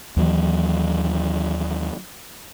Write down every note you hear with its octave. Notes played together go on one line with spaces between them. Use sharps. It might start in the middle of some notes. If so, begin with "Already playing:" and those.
D#2 E3 F#3